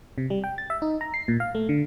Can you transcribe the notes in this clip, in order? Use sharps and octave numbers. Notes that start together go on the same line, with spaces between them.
C3
G3
G5
A6
E5
D#4
A#5
C7
A#2
F5
A3
D3